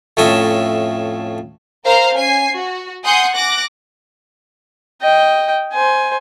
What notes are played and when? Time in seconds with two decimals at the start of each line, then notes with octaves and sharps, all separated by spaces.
0.17 F2 A2 C#4 A4 D#5 E5
1.84 A#4 C5 F5 A#5
2.13 C#4 G#5 C7
2.53 F#4
3.04 F#5 G#5 C6 D#6 G6
3.34 D6 F#6 A#6
5.02 D#5 G5
5.74 C5 G#5